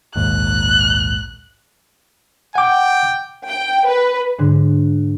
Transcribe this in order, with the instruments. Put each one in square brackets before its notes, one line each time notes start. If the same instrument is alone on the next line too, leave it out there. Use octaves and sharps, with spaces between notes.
[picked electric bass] A#1 D#2 G#2 [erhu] F#6
[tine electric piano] F#5 D6 [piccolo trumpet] G5
[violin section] G5
B4
[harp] G#2 D3 F#6